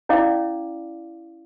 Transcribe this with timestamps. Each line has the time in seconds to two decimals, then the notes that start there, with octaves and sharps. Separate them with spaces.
0.09 C#4 E4 D5 F5 D6